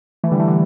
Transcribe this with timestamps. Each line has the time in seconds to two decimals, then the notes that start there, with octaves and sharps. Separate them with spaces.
0.24 E3 A3
0.32 D3 G3
0.39 E3 A3
0.48 D3